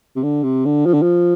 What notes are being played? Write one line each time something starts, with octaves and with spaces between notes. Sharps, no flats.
C3
D3
C3
D3
F3
D3
F3